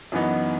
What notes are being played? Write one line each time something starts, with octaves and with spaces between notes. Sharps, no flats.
F#2 E3 B3 D#4